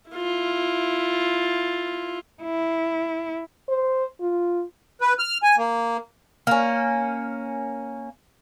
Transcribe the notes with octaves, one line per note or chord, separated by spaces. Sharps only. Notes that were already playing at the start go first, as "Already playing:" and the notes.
E4 F4
E4
C5
F4
B4
F6
G#5
A#3
A#3 C#4